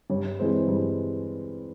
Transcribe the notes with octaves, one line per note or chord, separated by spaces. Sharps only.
G2 C#5
E3 G#3 C4
G2